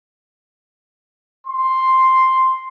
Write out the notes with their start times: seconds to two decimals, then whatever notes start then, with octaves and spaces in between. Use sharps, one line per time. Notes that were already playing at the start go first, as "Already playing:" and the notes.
1.47 C6